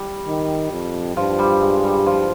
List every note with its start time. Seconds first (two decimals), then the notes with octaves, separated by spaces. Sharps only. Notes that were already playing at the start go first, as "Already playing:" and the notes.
Already playing: G3
0.28 D#3
0.72 F2
1.17 G2 F3
1.39 G3
1.62 G#3
1.84 G3
2.06 F3